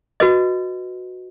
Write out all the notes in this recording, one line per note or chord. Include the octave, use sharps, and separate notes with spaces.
F#4 B4 D#5